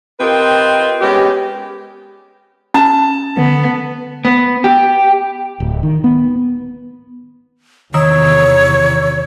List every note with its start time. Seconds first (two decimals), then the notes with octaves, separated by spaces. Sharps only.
0.20 C4 F4 G4 A#4 B4 D#5
1.01 G#3 B3 C#4 G4
2.74 C#4 A5
3.37 D3 B3
4.25 B3
4.64 G4
5.60 D1
5.83 D#3
6.04 B3
7.94 E2 C3 D#3 C#5 E6